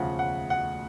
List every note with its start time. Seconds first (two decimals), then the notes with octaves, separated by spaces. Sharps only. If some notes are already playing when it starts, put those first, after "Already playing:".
Already playing: E1 D2 C#3 F3 F#5
0.19 F#5
0.50 F#5